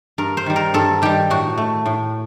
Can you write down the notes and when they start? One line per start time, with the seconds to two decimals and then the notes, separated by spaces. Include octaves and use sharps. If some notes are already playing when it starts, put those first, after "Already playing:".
0.18 G2 A#4
0.37 C5
0.46 D#3 G3
0.56 A#4
0.74 G2 A4
1.02 D#3 G3 G4
1.30 A2 F#4
1.58 A3
1.86 A2